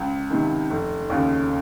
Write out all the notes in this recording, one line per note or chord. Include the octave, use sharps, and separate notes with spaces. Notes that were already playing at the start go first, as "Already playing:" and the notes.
Already playing: C#2
C3 D#3
F1
D#2 C#3